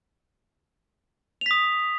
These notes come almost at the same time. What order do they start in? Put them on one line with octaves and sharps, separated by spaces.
F7 B6 D#6